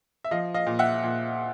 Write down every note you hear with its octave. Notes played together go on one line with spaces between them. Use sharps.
E5
F3 D#5 F5
D#5 F5
A#2
E5 F#5
A#2